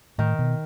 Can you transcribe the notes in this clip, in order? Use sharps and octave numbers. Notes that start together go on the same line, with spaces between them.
A2 D#3
B2